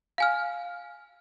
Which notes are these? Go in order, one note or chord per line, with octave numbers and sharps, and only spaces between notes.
F5 G#5 F6